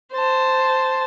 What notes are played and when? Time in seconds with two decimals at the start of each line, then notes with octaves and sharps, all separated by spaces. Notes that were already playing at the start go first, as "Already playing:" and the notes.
0.13 C5 A5